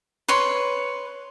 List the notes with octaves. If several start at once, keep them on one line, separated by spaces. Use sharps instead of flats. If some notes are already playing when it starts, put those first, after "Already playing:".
B4 C#5 C6